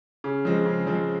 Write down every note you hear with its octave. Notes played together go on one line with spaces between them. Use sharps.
C#3
F3 G#3 C4
C#3
F3 G#3 C4